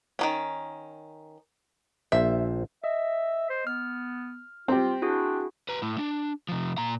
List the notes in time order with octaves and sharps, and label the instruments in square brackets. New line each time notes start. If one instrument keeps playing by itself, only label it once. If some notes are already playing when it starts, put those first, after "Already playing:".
[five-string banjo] D#3 F#3 C#4
[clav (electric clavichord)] A#1 C5 [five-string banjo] E5
[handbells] D#5 [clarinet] E5
[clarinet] C5
[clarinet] B3 [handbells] F6
[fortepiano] C4 G4 [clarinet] F4
[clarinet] D4 [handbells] E4 F#4 G#4
[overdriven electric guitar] B4 A#5
A2 A3
D4
C3 F3
A#2 A#5